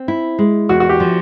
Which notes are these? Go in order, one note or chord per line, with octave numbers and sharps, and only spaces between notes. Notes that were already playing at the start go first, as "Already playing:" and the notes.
Already playing: C4
E4
G#3
E2 F#4
F#4
G4
F3